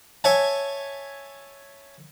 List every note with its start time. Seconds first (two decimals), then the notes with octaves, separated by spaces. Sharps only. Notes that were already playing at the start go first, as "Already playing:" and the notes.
0.24 C#5 E5 G#5 A5